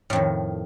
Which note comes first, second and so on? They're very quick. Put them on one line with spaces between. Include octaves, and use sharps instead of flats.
A2 F2 D#3